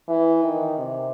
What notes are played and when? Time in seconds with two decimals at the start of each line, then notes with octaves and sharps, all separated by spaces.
0.08 E3
0.43 D#3
0.79 C3